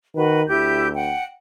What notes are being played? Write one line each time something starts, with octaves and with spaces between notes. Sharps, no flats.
D#3 F#4 B4
D2 E4 G4 G6
F#5 G5